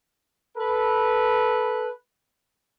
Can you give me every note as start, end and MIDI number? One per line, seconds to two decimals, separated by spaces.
0.58 1.90 69
0.58 1.90 71